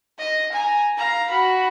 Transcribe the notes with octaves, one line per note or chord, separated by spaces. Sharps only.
D#5
G#5 A#5
F5 A#5
F#4 B5